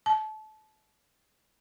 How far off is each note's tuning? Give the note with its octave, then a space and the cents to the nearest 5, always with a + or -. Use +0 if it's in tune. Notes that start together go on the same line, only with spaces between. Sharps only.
A5 -25